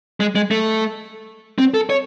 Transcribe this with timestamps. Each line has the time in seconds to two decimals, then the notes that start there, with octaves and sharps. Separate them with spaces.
0.20 G#3
0.35 G#3
0.51 A3
1.58 C4
1.74 A4
1.90 C#5